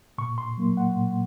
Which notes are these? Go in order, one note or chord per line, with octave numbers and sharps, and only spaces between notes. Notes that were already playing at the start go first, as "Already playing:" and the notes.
A#2 C#6
C6
F#3 A#3
F#5
A#2